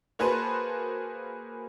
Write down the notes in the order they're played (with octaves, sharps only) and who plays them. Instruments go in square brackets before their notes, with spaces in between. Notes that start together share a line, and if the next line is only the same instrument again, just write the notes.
[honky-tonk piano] A#3 F#4 G#4 B4 C5 A5